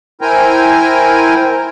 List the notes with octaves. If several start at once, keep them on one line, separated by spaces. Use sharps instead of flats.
E4 A#4 C5 G5 G#5 A#5